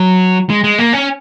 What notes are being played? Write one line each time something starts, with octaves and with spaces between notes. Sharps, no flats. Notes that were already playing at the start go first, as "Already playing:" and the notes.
Already playing: F#3
G#3
G#3
A#3
C#4